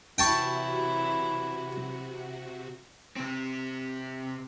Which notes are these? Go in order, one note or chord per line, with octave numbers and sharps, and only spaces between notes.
C3 E3 F#3 E4 F#4 G5 A5 C#6
C3 C4